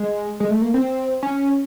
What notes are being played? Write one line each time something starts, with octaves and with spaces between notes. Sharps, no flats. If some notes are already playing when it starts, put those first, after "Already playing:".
Already playing: G#3
G#3
A3
A#3
C4
C#4